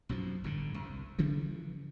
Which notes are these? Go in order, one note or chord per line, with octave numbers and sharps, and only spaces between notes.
B1 F#2 B2 F3
G1 A2 D3
C2
G2 C#3 E3 F3